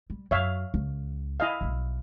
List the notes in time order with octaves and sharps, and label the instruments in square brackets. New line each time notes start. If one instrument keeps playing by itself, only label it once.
[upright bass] G3
[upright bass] F#2 [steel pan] C#5 E5 F5
[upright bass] C#2
[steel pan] E4 D#5 F5
[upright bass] B1 G3